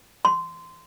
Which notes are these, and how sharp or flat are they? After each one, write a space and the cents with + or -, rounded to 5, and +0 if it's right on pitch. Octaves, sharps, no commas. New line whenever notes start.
C6 -15